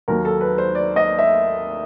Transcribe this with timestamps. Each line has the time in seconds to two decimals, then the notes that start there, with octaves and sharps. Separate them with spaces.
0.08 D#2 D#3 F#3 A#3 A#4
0.25 A4
0.41 B4
0.58 C5
0.75 D5
0.96 D#5
1.19 E5